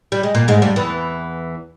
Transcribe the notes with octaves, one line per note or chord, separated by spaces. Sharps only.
G3
G#3
A#2 A#3
G#2 G#3
G2 G3
E2 E3